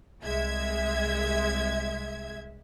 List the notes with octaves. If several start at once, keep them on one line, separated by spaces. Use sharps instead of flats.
C2 G#3 E5 G#6